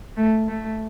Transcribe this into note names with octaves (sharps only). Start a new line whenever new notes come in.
A3
A3